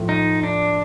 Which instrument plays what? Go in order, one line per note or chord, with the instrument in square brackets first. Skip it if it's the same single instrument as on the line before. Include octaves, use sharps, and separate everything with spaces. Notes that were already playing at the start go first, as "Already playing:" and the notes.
Already playing: [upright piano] A2 F3 A3
[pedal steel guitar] D#4
D4